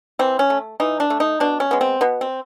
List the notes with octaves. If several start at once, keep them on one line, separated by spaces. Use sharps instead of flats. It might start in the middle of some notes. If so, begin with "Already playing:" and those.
E3 C4
C#4
A3
E3 D#4
D4
A3
D#4
B2 D4
C#4
G#3 B3
C4
B2 B3
C4